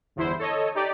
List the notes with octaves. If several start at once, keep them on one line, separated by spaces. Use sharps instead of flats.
G1 E2 E4 C5
A4 C#5 D#5
D#4 G4 D5